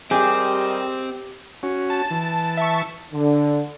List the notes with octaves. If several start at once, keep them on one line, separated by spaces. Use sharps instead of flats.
G3 C4 G4 G#4 A#4 D#5
C#4 F#4
A5
E3
E5 A5 C#6
D3